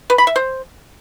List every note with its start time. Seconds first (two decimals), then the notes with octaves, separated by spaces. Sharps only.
0.10 B4
0.18 B5
0.27 E5
0.36 C5